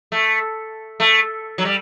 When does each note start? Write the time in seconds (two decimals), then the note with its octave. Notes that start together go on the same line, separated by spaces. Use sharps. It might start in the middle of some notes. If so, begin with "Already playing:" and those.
0.12 A3
1.00 A3
1.58 F#3
1.65 G3